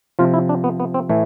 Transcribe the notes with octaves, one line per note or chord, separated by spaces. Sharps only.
C3 F3 F4
E4
D4
B3
B3
C4
A2 E3 A3